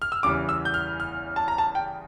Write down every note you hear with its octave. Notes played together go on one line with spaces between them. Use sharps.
F6
E6
E2 C#3 E3 G3 D6
E6
G6
F6
F6
A5
A#5
A5
G5